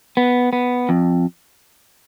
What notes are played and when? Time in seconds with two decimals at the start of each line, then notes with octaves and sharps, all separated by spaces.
0.17 B3
0.53 B3
0.89 F2